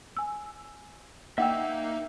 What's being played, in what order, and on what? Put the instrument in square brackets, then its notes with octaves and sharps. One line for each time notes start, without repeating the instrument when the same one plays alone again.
[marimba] G#5 E6
[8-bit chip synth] A#3 D#4 [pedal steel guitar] E5 E6 [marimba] F#5 G5